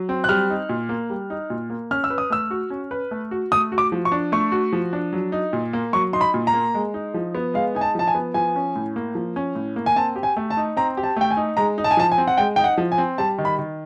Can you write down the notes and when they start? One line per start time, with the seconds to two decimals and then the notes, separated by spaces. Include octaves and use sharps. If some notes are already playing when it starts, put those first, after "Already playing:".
Already playing: F#3
0.09 C4
0.24 F#6
0.29 G3 F6
0.50 D#4
0.69 A#2
0.89 A#3
1.10 G3
1.30 D#4
1.50 A#2
1.70 A#3
1.91 C#4 F6
2.04 E6
2.10 B4
2.18 D#6
2.30 A3 E6
2.51 F#4
2.70 C#4
2.91 B4
3.11 A3
3.31 F#4
3.52 A3 D#6
3.72 F#4
3.78 D6
3.92 F3
4.05 C#6
4.12 D4
4.32 A3 C#6
4.52 F#4
4.73 F3
4.93 D4
5.13 F#3
5.32 D#4
5.53 A#2
5.73 A#3
5.93 F#3 C#6
6.13 D#4 C6
6.21 B5
6.34 A#2
6.47 A#5
6.53 A#3
6.74 G#3
6.94 D#4
7.14 F3
7.35 B3
7.54 G#3 F5
7.75 D#4 G#5
7.81 A5
7.95 F3 A5
8.08 G#5
8.15 B3
8.34 F3 G#5
8.56 C#4
8.76 A2
8.96 A#3
9.15 F3
9.36 C#4
9.55 A2
9.76 A#3
9.86 G#5
9.96 C4 A5
10.16 G4
10.23 G#5
10.37 A3
10.50 A5
10.57 D#4
10.77 C4 A#5
10.97 G4
11.03 A5
11.17 A3 G5
11.31 G#5
11.37 D#4
11.57 G#3 A#5
11.78 D#4
11.84 A5
11.91 G#5
11.97 F3 A5
12.12 G#5
12.18 C4
12.27 F#5
12.38 G#3 G5
12.56 D#4 G5
12.64 F#5
12.78 F3
12.92 G#5
12.98 C4
13.18 G3 A5
13.38 D#3
13.45 B5
13.59 D#3